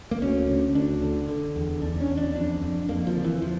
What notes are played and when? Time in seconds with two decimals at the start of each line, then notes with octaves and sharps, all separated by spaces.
0.11 A#3
0.22 D2 C#4
0.49 D3
0.75 D2 D4
1.02 D3
1.29 D3
1.56 E2
1.82 E2 D4
2.00 C#4
2.09 E2
2.17 D4
2.36 F2 D4
2.62 F2
2.89 F2 A#3
3.07 F3
3.16 D3
3.24 E3
3.42 F3